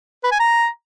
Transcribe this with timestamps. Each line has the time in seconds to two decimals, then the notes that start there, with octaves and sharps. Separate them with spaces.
0.24 B4
0.32 G#5
0.40 A#5